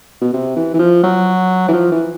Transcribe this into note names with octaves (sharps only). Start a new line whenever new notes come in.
B2
C3
E3
E3
F3
F#3
E3
F3
E3